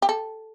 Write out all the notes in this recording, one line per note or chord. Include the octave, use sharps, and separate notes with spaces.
G4
A4